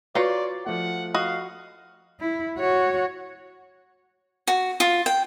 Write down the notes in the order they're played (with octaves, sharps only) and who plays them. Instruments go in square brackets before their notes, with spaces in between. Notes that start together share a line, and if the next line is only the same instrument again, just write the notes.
[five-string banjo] F4 C#5 A#5 [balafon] F#4 B4 [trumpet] D5
[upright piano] F3 A3 [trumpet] F#5
[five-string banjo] F#4 D#5 [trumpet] F5
[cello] E4
F#4 C#5
[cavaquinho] F#4
F4
G5